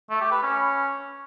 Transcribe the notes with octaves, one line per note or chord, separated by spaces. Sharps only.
A3
G4
B4
C#4